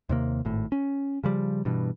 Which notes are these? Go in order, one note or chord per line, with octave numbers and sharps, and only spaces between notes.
D#2 C3 A#3
G#1 A2
C#4
C#3 F3 G3
G2 B2 E3